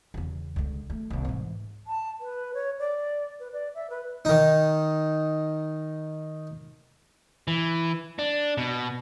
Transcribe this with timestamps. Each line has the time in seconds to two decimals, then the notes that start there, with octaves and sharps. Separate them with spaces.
0.14 E2 C#3
0.56 C#2 D3
0.90 A3
1.10 C2 A#3
1.25 G#2 E3
1.87 A5
2.20 B4
2.54 C#5
2.79 D5
3.40 B4
3.53 D5
3.75 E5
3.90 B4
4.25 D#3 D#4
7.48 E3
8.19 D4
8.58 B2